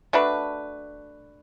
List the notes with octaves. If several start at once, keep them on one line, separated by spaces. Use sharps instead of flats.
A3 D4 F#4 B4